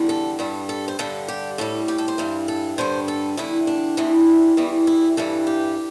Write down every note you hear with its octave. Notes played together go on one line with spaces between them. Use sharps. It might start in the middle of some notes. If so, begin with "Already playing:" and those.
Already playing: E2 D3 G3
A4
G2 G3 A4
A4
C5
G2 D3 G3 A4
G4
A2 G3 A4
G4
A4
C5
G2 E3 G3
A4
G2 D3 G3 C5
A4
E2 D3 G3 E4
D4
E2 C3 E3 G3
E2 E3 G3
E4
G2 E3 G3 A4
G4